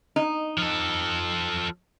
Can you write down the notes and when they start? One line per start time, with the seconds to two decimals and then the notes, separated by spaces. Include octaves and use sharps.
0.16 D#4
0.58 F3 A4